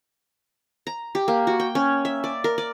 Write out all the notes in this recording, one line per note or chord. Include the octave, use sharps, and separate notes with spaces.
A#5
G4
A#3
F#4
G5
C#4
E5
D5
A#4
D5